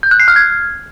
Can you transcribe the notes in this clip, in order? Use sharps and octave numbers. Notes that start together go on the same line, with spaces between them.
G6
F#6
C7
F6
G#6